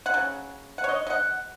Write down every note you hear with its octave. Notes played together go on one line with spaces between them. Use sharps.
F#5
C#3 F#3
F#5
C#5
D#5
D#5
F#5